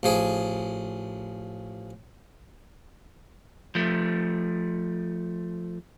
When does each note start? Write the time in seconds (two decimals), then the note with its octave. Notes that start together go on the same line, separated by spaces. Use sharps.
0.03 A1 F3 G#4
3.75 F3 A3